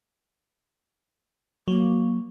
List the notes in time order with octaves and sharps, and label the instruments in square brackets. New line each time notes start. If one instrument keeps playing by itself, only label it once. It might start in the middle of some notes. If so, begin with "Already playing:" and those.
[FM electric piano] F#3 [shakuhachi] A#3